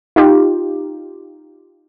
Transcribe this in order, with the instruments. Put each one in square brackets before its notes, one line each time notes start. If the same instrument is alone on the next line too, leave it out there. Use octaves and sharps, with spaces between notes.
[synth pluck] D#4 F4 G4